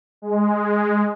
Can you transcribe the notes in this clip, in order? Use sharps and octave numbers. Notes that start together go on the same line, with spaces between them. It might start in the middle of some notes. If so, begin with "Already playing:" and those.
G#3